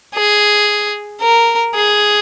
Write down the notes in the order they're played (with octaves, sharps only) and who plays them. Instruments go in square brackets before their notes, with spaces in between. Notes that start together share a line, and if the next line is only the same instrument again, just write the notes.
[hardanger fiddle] G#4
A#4
G#4